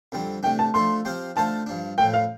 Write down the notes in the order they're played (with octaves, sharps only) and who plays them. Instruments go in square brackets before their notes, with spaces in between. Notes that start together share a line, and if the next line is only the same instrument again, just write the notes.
[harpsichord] F2 D3 G3 C4
[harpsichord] C3 A3 D4 [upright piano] G5
[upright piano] A5
[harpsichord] F3 A3 D4 A4 [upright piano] C6
[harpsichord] F3 C4 G4 C5 F5
[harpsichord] D3 A3 F4 C5 F5 [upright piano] A5
[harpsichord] G2 F3 D4
[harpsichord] A2 F3 A3 [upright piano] G5
[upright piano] F5